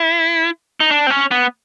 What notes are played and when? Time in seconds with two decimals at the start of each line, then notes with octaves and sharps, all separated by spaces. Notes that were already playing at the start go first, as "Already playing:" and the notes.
Already playing: E4
0.80 D#4
0.90 D4
1.07 C4
1.10 C#4
1.31 B3